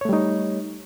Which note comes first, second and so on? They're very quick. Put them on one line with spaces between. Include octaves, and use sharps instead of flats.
C#5 A3 G3 D#4